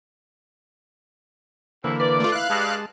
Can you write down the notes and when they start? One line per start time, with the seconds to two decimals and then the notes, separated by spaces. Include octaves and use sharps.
1.84 B2 D3 E3 A#3 C4 E4
2.00 B4 D5
2.20 A3 F4
2.32 E4 F5 F#6
2.50 G2 G#3 A5